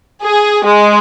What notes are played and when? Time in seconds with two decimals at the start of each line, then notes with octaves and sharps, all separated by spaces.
0.24 G#4
0.65 G#3